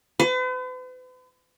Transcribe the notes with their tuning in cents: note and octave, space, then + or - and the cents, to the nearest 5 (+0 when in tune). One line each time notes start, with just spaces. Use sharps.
B4 +45